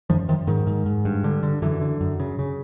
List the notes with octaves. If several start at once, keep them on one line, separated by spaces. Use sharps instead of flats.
F#2 D#3 F3
F#2 D#3 F3
G#2 D#3
G#2
G#2
G2
D3
D3
F#2 D3 E3
D3
F#2
C#3
C#3